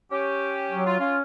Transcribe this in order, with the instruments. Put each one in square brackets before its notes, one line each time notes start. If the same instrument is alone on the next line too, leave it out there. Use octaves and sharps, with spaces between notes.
[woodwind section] C#4 G4
[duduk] F#3
[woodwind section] F4
[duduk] C#4 [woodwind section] F4